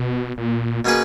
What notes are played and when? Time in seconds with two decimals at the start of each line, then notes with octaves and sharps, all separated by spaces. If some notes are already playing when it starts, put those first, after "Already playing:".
Already playing: B2
0.38 A#2
0.85 B2 A#3 C#4 G#4 B4